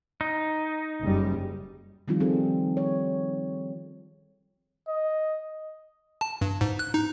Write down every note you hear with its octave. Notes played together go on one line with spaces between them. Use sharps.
D#4
F#1 G3
D#3 F3 G3 C4 D#4 F4
C4 G#4 A4
C#5
D#5
A5
G2
G#2
F#6
D#4